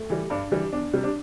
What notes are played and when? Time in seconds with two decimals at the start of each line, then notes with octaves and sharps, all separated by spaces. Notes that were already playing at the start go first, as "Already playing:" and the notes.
Already playing: A3
0.10 E3 G3
0.30 G2 D4
0.51 E3 G3
0.73 E2 D4
0.93 C3 G3
1.04 D4